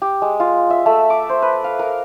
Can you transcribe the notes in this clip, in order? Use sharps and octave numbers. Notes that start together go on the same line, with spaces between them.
G4
G#3
F4
E5
A3
D6
C5
B4
F5
A#4